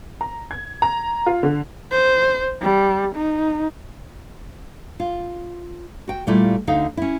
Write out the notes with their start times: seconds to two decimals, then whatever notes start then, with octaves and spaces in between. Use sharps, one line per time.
0.21 A#5
0.51 G#6
0.82 A#5
1.26 F4
1.43 D3
1.92 C5
2.61 G3
3.16 D#4
5.00 F4
6.08 F#4 G5
6.27 A#2 G3 A3 E4 F4
6.67 D2 D3 D#4 F5
6.97 C#4 E4